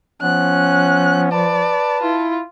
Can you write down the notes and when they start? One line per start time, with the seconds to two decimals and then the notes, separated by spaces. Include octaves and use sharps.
0.22 F3 B3 C#4 F#6
1.32 B4 D5 A5
2.03 E4 F4